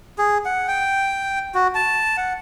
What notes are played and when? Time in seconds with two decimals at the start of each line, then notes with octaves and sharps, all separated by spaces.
0.18 G#4
0.45 F#5
0.68 G5
1.55 F#4
1.75 A5
2.17 F#5